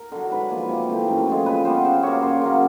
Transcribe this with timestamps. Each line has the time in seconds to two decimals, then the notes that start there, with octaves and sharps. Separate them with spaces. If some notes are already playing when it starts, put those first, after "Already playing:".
Already playing: A#4
0.12 D3 F#3
0.31 G#2 B4
0.50 F3 A#3
0.69 C3
0.89 E3 A3 C4
1.08 F#2
1.27 D3 F3 G#3
1.46 A#2 B4
1.65 G3 B3 C5
1.85 C#3 C5
2.03 F#3 A#3 C#5
2.22 F#2 C5
2.42 C#3 F#3 A#3